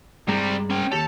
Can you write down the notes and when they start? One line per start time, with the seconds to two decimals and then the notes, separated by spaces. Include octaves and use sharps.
0.28 G2 C3 G3 G#3 A#5
0.70 C#4 G5
0.92 D#2 G4 A4 C#5